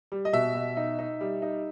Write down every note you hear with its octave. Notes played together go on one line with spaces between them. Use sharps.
G3
D#5
B2 E5
B2
D#4
D#4
G3
D#4